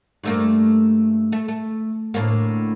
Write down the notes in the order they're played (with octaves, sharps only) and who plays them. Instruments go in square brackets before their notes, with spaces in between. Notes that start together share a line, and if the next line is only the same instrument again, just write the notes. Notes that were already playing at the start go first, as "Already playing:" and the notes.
[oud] G2 A3 A#3
A3
A3
D2 A2 A#3